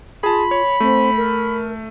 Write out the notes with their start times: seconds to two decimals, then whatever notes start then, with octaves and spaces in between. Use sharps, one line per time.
0.23 F4 G#4 A5 B5
0.51 C#5
0.80 A3 C4
1.17 A#4